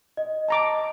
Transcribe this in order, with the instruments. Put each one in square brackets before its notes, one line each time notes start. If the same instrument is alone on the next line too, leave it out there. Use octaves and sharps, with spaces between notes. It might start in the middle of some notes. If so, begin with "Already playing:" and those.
[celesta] D#5
[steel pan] A5 A#5 D6